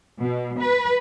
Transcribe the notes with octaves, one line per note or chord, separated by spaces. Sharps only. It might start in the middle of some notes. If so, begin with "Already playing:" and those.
B2
B4